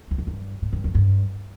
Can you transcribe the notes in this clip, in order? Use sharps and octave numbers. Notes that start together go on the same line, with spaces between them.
E2
F2
G2
A2
G2
F2
G2